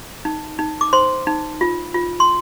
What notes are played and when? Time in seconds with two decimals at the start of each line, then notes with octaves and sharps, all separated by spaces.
0.25 D#4
0.59 D#4
0.81 D6
0.93 C5 C6
1.27 D#4
1.61 F4
1.94 F4
2.20 C6